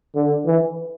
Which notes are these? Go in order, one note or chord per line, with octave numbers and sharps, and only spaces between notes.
D3
E3